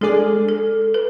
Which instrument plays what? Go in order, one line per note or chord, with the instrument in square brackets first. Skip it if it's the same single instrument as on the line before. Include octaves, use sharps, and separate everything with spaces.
[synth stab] G#3 D4 G#4 D5 [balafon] A4
[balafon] A4
B4